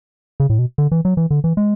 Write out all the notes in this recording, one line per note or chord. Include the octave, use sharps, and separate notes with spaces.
C#3
A2
B2
D3
E3
F#3
E3
D3
E3
G#3